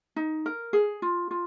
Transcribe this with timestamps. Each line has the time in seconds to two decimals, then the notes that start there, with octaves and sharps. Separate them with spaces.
0.16 D#4
0.46 A#4
0.73 G#4
1.02 F4
1.31 F4